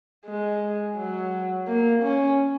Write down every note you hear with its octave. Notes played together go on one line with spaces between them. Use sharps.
G#3
F#3
A#3
C#4